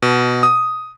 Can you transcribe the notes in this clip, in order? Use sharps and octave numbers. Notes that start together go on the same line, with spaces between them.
B2
D#6